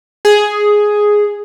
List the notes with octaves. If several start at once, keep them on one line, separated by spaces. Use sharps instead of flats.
G#4